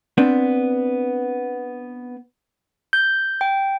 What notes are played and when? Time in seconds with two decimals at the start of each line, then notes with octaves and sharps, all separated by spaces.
0.18 B3 C4 D4
2.93 G6
3.41 G5